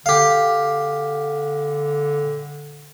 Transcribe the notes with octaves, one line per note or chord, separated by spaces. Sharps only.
D3 G4 F5